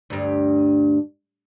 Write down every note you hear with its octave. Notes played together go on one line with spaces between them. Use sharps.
D2 G2